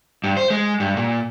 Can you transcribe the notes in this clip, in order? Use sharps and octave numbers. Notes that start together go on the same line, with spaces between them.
G2
C5
G#3
G2
A#2